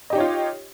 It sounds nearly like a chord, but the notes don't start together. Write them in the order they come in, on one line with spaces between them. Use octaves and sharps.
D#5 G4 D#4 C#5 F4